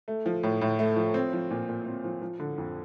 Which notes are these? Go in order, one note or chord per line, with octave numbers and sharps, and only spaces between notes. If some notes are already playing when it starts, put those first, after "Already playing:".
A3
F3
A2
A2
A3
F3
C4
F3
A#2
A#2
C4
F3
F3
D3
F2